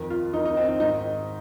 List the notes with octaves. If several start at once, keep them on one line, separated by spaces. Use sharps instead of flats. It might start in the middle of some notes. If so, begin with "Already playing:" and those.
Already playing: F2 D#3
F4
F2 D#3 D#4
D#4
C4
D#4
G#2 D#3 D#4